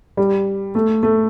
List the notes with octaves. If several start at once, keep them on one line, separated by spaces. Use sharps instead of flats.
G3
A3
A3